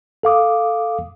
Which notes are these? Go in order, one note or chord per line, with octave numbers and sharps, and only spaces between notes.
A4 F5 D6 D#6